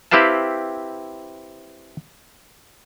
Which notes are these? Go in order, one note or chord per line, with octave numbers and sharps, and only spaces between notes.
C4 E4 G4 B4 F5 A5